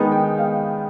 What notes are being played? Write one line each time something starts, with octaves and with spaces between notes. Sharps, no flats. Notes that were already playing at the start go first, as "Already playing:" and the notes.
Already playing: D#3 G#3 B3 D#4
G5
F5